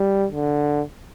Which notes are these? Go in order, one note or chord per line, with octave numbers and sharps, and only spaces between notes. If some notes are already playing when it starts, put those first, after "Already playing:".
Already playing: G3
D3